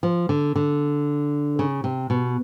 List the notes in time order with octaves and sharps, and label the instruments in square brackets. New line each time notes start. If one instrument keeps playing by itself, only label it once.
[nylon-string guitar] F3
D3
D3
C#3
C3
B2